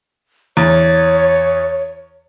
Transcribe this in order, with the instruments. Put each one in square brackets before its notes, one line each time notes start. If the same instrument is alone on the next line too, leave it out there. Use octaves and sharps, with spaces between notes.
[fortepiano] E2 [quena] C#5